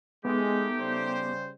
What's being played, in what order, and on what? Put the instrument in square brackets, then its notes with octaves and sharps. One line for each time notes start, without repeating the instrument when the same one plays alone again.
[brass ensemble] G#3 [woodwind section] A3 D#4 G4 [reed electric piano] B3
[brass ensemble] C#3 G3 C5